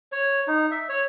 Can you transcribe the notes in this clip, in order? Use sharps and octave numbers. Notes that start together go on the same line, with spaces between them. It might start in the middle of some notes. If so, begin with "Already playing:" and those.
C#5
D#4
E5
C#5